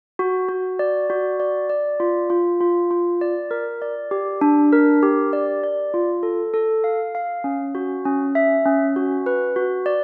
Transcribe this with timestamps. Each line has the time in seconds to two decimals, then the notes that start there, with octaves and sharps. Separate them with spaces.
0.19 F#4
0.49 F#4
0.79 D5
1.10 F#4
1.40 D5
1.70 D5
2.00 F4
2.30 F4
2.61 F4
2.91 F4
3.21 D5
3.51 A#4
3.82 D5
4.11 G4
4.41 D4
4.73 A#4
5.03 G4
5.33 D5
5.64 D5
5.94 F4
6.23 A4
6.54 A4
6.84 F5
7.15 F5
7.44 C#4
7.75 F#4
8.05 C#4
8.35 E5
8.66 C#4
8.96 F#4
9.26 B4
9.56 F#4
9.86 D5